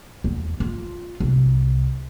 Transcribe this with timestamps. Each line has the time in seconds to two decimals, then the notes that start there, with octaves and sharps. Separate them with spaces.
0.24 E2
0.60 F4
1.20 C2